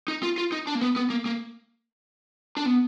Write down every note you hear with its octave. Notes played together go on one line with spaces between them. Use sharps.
D#4
F4
F4
D#4
D4
A#3
B3
B3
A#3
A#3
D4
B3